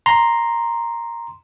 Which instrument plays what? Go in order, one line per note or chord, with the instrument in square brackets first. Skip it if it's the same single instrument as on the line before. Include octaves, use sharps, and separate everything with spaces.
[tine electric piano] A#5 C6